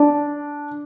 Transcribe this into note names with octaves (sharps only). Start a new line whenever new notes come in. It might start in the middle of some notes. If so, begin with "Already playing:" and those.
Already playing: D4